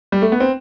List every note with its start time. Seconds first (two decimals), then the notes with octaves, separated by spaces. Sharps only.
0.12 G3
0.22 A3
0.32 B3
0.40 C4